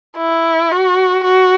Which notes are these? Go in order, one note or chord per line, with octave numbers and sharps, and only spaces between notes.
E4
F#4
F#4